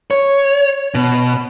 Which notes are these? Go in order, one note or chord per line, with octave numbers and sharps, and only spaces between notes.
C#5
B2